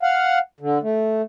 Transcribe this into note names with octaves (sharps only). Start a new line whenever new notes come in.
F5 F#5
D3
A3